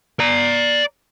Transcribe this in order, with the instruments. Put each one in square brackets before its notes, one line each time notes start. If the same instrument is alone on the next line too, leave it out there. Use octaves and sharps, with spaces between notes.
[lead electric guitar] D5 A#5